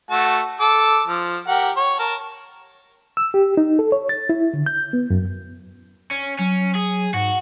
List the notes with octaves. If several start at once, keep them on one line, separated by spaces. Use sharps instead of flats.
A3 F#4 A5
A4 D6
F3
G4 A#4 F#5
C#5
A#4 A5
E6
G4
D#4
A4
C#5
A6
E4
D3
G6
B3
F#2
C#4
F#3 C#4
G#4
G#2 F#4